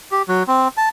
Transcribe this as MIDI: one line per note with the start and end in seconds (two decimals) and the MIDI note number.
0.12 0.23 67
0.28 0.43 54
0.48 0.68 60
0.77 0.89 81